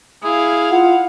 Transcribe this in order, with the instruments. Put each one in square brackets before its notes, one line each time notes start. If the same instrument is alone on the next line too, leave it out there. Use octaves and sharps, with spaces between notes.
[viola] E4 F5 [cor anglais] G#4
[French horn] F4 [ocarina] F#5